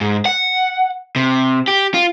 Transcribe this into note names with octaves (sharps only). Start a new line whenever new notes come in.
G#2
F#5
C3
G4
F4